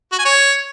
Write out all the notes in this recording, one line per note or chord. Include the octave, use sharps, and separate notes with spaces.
F#4
G#5
C#5